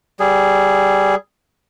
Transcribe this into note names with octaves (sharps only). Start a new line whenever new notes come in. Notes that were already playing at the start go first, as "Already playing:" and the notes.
G3 G#4